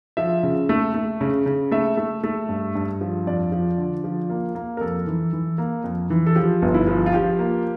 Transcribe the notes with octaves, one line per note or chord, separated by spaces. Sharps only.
F3 E5
C#3
A3
A3
C#3
C#3
A3 E5
A3
A3
G2
G2
F3
F2 D5
F3
D3
F3
A#3
A#3
A#4
F2 A4
E3
E3
A#3
F2
E3
A4
F3 G4
G1
E4
F3
F4
F3 G4
A#3